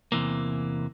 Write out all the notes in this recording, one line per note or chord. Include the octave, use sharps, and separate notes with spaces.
E2 C3 E3 A#3